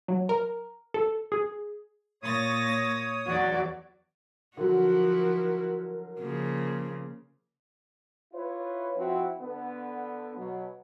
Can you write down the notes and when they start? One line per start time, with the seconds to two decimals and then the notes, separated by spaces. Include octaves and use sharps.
0.08 F#3
0.29 A#4
0.94 A4
1.32 G#4
2.23 A#2 C#5 D#6 A6 A#6
3.26 E2 F#3 F#4 D5
4.57 D3 F3 F#3 E4 F#4 A#4
6.20 C#3 F3 A#3
8.33 E4 F4 B4 C#5
8.95 F3 C4 E4 F#4
9.40 D3 B3
10.36 B2 F#3